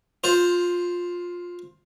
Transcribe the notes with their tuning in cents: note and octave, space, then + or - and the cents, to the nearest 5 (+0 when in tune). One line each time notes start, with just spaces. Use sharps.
F4 +15 C5 +0